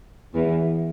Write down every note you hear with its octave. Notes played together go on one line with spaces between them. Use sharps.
E2 E3